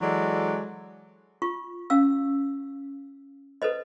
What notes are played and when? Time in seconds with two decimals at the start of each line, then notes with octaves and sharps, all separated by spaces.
0.01 E3 F#3 G#3 F#4 A4 D5
1.42 F4 C#6
1.90 C#4 F5 E6
3.62 A4 B4 C5 D#5